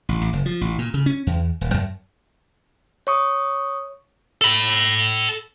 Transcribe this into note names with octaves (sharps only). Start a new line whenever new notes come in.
A1
A1
F#1
F3
A1
A#2
C#3
C#4
E2
D#1
F#2
C#5 C#6 D#6
A4 B5